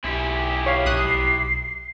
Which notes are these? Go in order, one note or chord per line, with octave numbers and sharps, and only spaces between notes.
B1 E4 G4 G#5
C#5 F5 C7
A#1 D#6 F#6